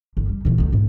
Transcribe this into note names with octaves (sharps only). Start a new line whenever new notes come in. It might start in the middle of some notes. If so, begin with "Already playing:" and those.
G1
G3
B2 E3
D2 D#3
G#2 A3